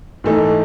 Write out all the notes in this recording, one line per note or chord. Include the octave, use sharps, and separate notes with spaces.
G#2 E3 A3 D#4